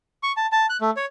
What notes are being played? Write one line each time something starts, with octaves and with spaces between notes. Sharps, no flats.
C#6
A5
A5
F#6
A3
C#5